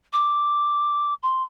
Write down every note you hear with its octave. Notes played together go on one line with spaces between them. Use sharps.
D6
C6